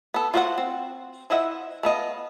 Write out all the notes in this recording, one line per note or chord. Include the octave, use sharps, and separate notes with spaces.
B3 A4
F4 F#4 C5 E5 F#5
C4
F3 E4 D#5 E5 F#5
A3 B3 D#5 F5